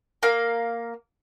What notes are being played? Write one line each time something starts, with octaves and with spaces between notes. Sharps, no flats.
A#3 F5